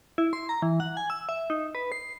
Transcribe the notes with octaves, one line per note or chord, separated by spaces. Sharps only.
E4
C6
A#5
E3
F#5
G#5
E6
E5
D#4
B4
C7